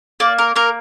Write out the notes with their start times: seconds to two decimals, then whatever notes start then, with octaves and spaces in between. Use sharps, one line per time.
0.20 A#3 D5
0.38 A#4
0.56 A#3 A#4